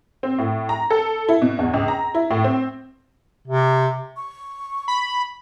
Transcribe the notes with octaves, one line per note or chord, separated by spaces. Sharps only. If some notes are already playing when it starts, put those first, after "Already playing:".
C4
A2
A#5
A4
E4
B2
E2
C#2
A#5
E4
A2
C4
C3
C#6
B5